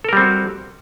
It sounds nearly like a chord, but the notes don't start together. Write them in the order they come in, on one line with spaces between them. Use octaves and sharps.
A4 A#4 G3 C4 F#4